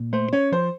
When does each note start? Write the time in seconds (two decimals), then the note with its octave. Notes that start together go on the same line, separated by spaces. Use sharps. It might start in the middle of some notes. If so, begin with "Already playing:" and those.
Already playing: A#2
0.13 A3 C5
0.33 C#4 C#5
0.52 F3 C5